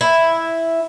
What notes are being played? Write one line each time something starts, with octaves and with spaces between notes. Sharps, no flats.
E4